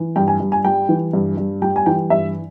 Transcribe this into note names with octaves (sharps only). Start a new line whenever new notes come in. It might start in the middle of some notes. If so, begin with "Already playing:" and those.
Already playing: E3
G2 G5
G#5
G2
G#5
G3 G5
E3
G2
G2
G3 G5
G#5
E3 G5
G2 E5